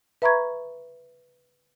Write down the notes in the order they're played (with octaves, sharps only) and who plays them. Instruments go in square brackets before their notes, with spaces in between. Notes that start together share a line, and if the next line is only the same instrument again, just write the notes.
[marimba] B4 E5 A#5 B5 C#6 G#6